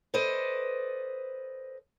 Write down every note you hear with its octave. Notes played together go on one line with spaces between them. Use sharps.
A4 B4 C5 D5 D#5